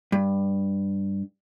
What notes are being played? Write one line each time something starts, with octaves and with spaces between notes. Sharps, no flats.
G2